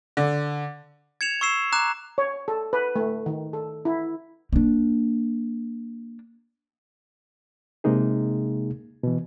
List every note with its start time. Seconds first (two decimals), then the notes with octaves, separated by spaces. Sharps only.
0.17 D3
1.21 G#6 C#7 E7 F7
1.41 C#6 E6 C7 E7
1.72 A#5 D6 F#6 E7
2.18 C#5
2.48 A4
2.73 B4
2.96 A3
3.26 D#3
3.53 A4
3.85 E4
4.53 A#3 D4
7.84 C3 G#3 A#3 D#4 G#4
9.03 B2 E3